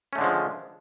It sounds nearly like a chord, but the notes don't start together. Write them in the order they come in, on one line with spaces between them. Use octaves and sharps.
C#4 A3 D3 G#3 F3